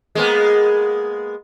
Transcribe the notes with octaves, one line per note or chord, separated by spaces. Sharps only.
G#3 A#3 B3